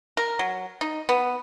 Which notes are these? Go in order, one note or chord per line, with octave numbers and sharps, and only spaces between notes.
A#4
F#3
D#4
B3